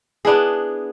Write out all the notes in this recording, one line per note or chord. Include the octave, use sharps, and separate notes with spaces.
B3 D4 E4 G#4